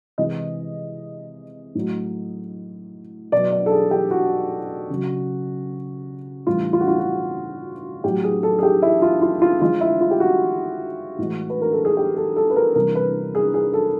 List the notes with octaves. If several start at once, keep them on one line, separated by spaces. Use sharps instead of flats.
C3 E3 G#3 D#5
A2 F#3
B2 F#3 D5
D5
A4
G#4
G4
F#4
C#3 F#3
A2 E3 G3 F4
F4
F#4
F4
F#4
A2 F#3 G4
G#4
A4
G#4
G4
E4
F4
F4
F4
D3 F3 G#3 F4
E4
F4
G4
F#4
A2 E3 G#3
B4
A#4
A4
G#4
G4
A4
A4
B4
A#4
C3 E3 G3 A#4
B4
G#4
G#4
A4